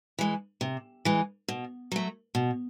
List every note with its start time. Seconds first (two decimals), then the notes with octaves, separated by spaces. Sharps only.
0.19 E3 G#3
0.61 C3
1.05 E3 G#3
1.48 B2
1.92 F#3 A3
2.35 B2